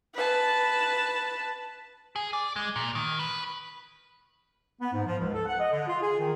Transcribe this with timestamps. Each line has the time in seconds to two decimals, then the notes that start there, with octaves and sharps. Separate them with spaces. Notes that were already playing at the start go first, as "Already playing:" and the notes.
0.15 B4 A5
2.16 G#4
2.33 D5
2.56 G#3
2.76 A#2
2.95 D#3
3.19 B4
4.81 B3
4.93 G#2
5.06 F3
5.18 C#2
5.34 A4
5.46 F#5
5.60 D#5
5.71 D3
5.87 F4
6.01 G#4
6.19 D#3